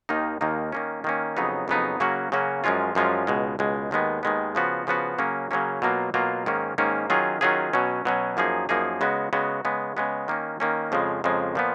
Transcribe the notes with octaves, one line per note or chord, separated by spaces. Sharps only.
D#2 D#3 A#3 D#4
D#2 D#3 A#3 D#4
D#3 A#3 C#4
D#3 A#3 C#4
F2 C#3 F#3 B3 D#4
F2 C#3 F#3 B3 D#4
C#3 F#3 A#3 C#4 F#4
C#3 F#3 A#3 C#4 F#4
F#2 F3 G#3 C#4 F4
F#2 F3 G#3 C#4 F4
C#2 B2 G#3
C#2 B2 G#3
D#2 D#3 G#3 B3
D#2 D#3 G#3 B3
C#3 F3 B3 F#4
C#3 F3 B3 F#4
C#3 F#3 A#3 C#4
C#3 F#3 A#3 C#4
B2 F#3 A#3 F4
B2 F#3 A#3 F4
G#2 D#3 A#3 C#4
G#2 D#3 A#3 C#4
D#3 F#3 C#4 F4 G#4
D#3 F#3 C#4 F4 G#4
B2 F#3 C#4
B2 F#3 C#4
F#2 F3 A#3 D#4 G#4
F#2 F3 A#3 D#4 G#4
C#3 G#3 B3 F#4
C#3 G#3 B3 F#4
C#3 G#3 B3
C#3 G#3 B3
D#3 A#3 C#4
D#3 A#3 C#4
F2 C#3 F3 G#3
F2 C#3 F3 G#3
A#2 F3 B3